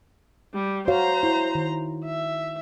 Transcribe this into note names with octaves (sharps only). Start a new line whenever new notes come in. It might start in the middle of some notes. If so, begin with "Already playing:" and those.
G3
F#4 C5 C#5 F5 A#5
E4
D#3
E5